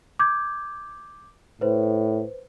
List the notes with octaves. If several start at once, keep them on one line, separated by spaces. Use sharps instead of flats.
D6 G6 G#6
A2 B4 C5